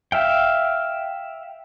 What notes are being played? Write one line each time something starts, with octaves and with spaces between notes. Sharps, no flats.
E5 F5 G5